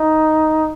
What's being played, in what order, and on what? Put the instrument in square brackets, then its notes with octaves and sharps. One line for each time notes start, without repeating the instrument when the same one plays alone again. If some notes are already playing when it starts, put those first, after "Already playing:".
Already playing: [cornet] D#4